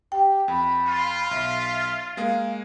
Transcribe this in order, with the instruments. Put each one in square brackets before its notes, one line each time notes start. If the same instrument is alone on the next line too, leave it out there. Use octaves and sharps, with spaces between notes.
[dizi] G4 [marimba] G5
[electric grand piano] F2 [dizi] B5
[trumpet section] F4
[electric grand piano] B1 F6 [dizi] E5
[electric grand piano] G#3 A#3 G#4 [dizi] F5